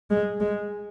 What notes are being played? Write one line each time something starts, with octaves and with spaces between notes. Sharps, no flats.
G#3
G#3